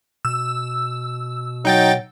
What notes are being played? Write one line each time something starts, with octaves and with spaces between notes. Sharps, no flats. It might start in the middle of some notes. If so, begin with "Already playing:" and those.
B2 E6
F#3 D#4 G5 A6